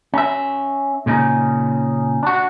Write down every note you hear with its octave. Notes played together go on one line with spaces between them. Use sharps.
C#4 E5
A#2 C#3 C#4 D#4
D4 F#4